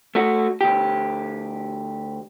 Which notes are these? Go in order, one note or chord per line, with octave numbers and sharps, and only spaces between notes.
A3 F#4
D2 G4